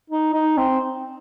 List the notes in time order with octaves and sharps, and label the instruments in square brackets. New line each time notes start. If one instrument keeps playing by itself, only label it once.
[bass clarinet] D#4
D#4
C4